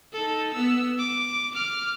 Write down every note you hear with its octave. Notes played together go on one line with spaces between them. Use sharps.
D#4 A4
B3 E6
D6
D6 F6